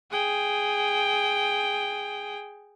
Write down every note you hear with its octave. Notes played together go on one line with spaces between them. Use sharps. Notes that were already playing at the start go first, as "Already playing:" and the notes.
G#4 G5